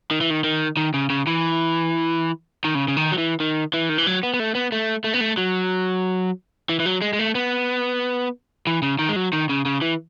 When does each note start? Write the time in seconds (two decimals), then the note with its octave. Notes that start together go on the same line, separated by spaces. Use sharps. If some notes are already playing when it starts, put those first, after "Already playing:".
0.11 D#3
0.21 E3
0.30 D#3
0.44 D#3
0.77 D#3
0.94 C#3
1.10 C#3
1.27 E3
2.64 D#3
2.75 C#3
2.88 C#3
2.97 D#3
3.12 F#3
3.18 E3
3.40 D#3
3.73 E3
3.89 D#3
3.98 E3
4.07 F#3
4.23 B3
4.34 B3
4.40 A3
4.55 B3
4.72 A3
5.04 A3
5.14 B3
5.20 A3
5.37 F#3
6.69 E3
6.80 E3
6.86 F#3
7.02 G#3
7.13 G#3
7.19 A3
7.35 B3
8.67 E3
8.82 C#3
8.99 D#3
9.09 G#3
9.16 F#3
9.33 D#3
9.49 C#3
9.65 C#3
9.81 E3